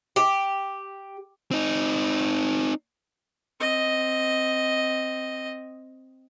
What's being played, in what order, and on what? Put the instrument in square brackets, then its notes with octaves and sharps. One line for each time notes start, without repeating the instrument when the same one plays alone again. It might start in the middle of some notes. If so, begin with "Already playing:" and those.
[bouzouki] G4
[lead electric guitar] C4 D#4
[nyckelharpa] C4 D#5